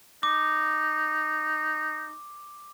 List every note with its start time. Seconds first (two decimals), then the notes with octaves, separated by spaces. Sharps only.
0.23 D#4 D6